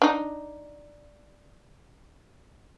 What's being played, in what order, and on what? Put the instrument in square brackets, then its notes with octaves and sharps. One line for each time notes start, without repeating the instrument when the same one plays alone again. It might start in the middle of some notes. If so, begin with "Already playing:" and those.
[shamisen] D4 D#4